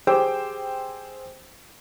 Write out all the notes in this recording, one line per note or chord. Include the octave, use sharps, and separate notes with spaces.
G4 G#4 C5 G5 D6 E6